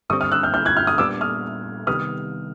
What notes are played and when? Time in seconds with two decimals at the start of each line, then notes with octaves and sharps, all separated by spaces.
0.10 G2 D3 G3 C4 C#6 D#6
0.21 D#6 F6
0.32 E6 F#6
0.43 F6 G6
0.54 F6 G6
0.65 F#6 G#6
0.77 F6 G6
0.87 D#6 F6
0.98 A#2 G3 B3 D4 D6 E6
1.21 D#6 F6
1.87 C3 D#3 G3 B3 D#6 F6